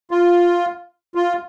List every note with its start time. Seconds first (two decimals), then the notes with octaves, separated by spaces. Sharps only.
0.11 F4
1.15 F4